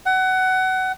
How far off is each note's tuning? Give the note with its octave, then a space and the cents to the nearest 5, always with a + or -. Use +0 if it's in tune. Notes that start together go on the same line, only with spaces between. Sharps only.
F#5 +20